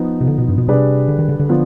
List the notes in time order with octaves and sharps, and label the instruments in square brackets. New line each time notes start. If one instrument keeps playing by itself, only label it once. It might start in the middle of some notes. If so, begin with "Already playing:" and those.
Already playing: [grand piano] F3 B3 D#4
[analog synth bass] C3
D3
B2
G2
B2
[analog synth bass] C3 [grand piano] G3 D4 G#4 B4 D5
[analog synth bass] D3
D#3
D3
D3
[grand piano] F3 B3 D4 F4